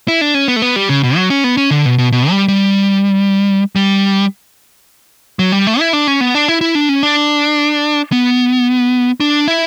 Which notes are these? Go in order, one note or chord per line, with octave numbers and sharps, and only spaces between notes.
E4
D4
C#4
B3
A3
B3
G3
C#3
B2
F#3
C#4
B3
C#4
D3
B2
B2
B2
G3
G3
G3
F#3
G3
A3
E4
D4
C#4
B3
D4
E4
E4
D4
C#4
D4
B3
D4
E4